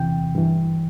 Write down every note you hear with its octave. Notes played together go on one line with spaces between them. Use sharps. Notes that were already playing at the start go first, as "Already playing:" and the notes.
Already playing: E2 C3 E3 G5
G2 E3